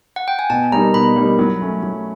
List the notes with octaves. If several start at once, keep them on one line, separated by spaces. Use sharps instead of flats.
F#5
G5
G#5
B2 A5
G3 A#3 D#4 A#5
B2 B5
G3 A#3 D#4
F#3
A3 C#4
F#3